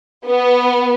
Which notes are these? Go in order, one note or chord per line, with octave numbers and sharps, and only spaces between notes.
B3